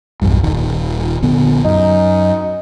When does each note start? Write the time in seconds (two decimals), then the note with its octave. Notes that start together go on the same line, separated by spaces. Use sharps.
0.22 B1 E2 G2
0.43 D#1 D#3
1.22 A#1 D3 B3
1.65 F#2 D#4